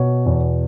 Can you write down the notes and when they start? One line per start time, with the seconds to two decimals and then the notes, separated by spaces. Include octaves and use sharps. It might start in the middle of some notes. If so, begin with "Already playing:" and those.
Already playing: B2 C#5
0.26 E2